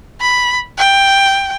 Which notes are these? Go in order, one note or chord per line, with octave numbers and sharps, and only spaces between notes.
B5
G5